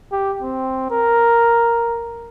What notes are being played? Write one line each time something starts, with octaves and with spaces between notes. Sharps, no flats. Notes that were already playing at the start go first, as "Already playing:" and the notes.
G4
C4
A#4